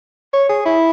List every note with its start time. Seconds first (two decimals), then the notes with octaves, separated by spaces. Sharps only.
0.34 C#5
0.49 G#4
0.66 E4